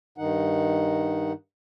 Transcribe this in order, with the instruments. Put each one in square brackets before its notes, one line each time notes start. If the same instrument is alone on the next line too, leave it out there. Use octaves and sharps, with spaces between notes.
[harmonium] G2 D#3 D#4 F#5